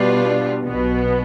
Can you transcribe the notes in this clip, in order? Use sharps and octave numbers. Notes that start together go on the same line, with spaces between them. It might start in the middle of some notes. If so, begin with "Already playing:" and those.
Already playing: B2 G3 D4 F4 B4
B1 B2 B3